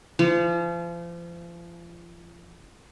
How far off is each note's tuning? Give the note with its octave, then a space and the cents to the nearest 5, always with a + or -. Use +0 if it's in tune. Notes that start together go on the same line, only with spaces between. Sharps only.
F3 -35